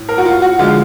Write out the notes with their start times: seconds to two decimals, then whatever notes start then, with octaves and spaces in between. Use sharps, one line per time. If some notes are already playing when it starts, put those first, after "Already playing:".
Already playing: A2
0.09 A#4
0.18 F#4
0.25 F4
0.42 F#4
0.59 D3 F3 G#3 F4